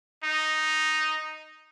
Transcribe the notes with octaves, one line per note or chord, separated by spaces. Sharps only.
D#4